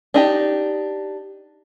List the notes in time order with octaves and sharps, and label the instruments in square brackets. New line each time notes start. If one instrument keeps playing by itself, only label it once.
[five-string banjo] D4 D#4 G4